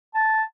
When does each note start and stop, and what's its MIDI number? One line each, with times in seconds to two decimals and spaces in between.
0.15 0.42 81